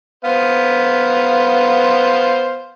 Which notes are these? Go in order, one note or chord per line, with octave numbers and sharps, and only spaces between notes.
B3 C5 F5